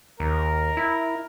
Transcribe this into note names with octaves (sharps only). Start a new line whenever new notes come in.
D#2 A#4
E4